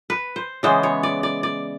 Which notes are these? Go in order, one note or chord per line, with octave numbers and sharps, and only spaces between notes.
B4
C5
C#3 E3 G#3 B3 C5
C#5
D5
D5
D5